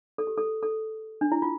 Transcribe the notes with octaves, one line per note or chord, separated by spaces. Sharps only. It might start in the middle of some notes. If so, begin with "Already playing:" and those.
A4
G4
A4
A4
D4
E4
F4